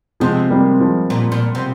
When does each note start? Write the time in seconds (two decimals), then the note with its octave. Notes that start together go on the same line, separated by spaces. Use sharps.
0.20 C3 F3 G#3
0.50 G3 A#3
0.80 F3 G#3
1.10 A#2
1.32 A#2
1.55 C3